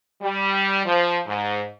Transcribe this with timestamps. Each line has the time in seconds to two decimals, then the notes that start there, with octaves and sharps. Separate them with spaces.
0.22 G3
0.85 F3
1.26 G#2